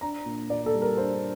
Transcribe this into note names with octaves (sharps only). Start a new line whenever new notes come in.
D4 A#5
A#2
A#2 D5
A4
G3
A#4
D4 C5